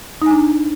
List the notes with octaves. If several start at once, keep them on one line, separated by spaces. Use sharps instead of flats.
D4 D#4 G#5